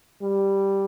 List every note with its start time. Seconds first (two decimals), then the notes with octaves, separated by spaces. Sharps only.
0.22 G3